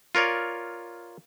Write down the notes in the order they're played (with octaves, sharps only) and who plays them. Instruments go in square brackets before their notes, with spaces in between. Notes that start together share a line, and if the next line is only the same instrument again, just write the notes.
[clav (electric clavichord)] F4 A#4 C#5 D5